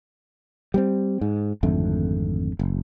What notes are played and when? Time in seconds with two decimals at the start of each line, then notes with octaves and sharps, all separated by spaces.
0.74 G3 B3 C4
1.21 G#2
1.63 G#1 F2 D3 A3
2.59 F#1